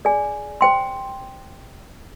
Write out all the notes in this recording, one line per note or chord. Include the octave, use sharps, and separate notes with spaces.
G#4 D5 G#5
C5 G5 C6